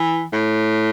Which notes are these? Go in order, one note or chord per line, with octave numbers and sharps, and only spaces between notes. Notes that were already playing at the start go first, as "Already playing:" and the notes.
Already playing: E3
A2